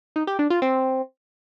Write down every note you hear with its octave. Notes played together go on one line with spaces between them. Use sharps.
D#4
G4
D4
F4
C4